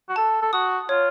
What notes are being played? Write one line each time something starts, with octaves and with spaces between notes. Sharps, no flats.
F#4
A4 A5
A4
F#4 D#6
F4 C#5